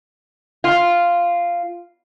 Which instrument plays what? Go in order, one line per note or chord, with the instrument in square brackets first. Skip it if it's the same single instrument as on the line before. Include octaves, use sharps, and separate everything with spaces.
[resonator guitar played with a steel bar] F4